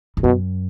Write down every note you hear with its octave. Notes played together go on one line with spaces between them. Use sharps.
E2
F#2 B2